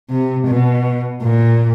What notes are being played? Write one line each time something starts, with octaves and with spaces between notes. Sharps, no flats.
C3
B2
A#2